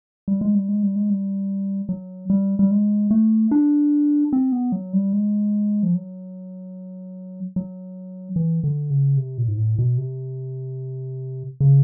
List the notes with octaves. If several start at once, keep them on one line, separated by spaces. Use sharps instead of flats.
G3
G#3
G3
G#3
G3
G#3
G3
F#3
G3
G3
G#3
A3
D4
C4
B3
F#3
G3
G#3
F3
F#3
F#3
E3
D3
C#3
C3
A#2
G#2
A2
B2
C3
C#3